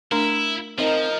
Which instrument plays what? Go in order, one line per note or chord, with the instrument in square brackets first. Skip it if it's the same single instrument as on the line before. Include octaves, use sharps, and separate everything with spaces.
[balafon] A3 D4 [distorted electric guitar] E4 [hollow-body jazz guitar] A#4
[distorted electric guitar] F3 [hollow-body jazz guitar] C4 D#4 [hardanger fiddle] A#4 D#5